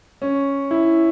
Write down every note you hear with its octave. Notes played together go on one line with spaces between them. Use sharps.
C#4
E4